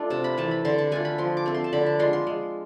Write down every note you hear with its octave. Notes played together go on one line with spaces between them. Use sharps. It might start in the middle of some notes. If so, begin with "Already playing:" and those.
Already playing: A3 D4 F4
C3 A5
B5
E3 A3 A5
B5
D3 C6
A5
A3 D4 F4 G#5
B5
F3 C6
D6
A3 C4
C6
A5
D3 B5
A5
G#3 D4 F4 C6
C6
G#3